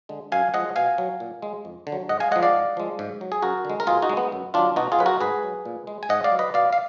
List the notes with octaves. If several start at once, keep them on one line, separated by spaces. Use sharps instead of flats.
D3 G#3
F#2 F5 G#5
F3 G#3 D#5 F#5
B2 F5 G#5
F#3
A#2
G#3
F2
D3
F#3
G#2 D#5 F#5
F5 G#5
F3 G#3 D#5 F#5
D5 F5
G#2
F3 G#3
G#2
F#3
G#4
F#2 F#4 A#4
D3 G#3
A#4
B2 F4 G#4
D#4 F#4
G#3
B3
F#2
D#3 F#3 D4 F4
B2 D#4 F#4
F4 G#4
F#3 B4
F#4 A#4
G#2 G#4 B4
F#3
A#2
G#3
G#5
G#2 D#5 F#5
D5 F5
F#3
B4 D#5
B2 D5 F5
F5